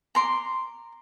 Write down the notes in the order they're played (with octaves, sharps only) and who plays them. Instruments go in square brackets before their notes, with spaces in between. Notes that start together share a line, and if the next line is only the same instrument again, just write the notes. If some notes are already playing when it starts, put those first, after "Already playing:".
[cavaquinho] A#5 C6 D6